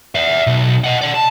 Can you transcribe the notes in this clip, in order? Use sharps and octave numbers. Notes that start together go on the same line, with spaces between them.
E5 F#5
B1
D#5 F#5
D5 F#5
A5